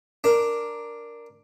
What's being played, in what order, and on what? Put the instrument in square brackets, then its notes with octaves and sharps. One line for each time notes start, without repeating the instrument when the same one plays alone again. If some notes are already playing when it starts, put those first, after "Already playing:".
[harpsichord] D4 A#4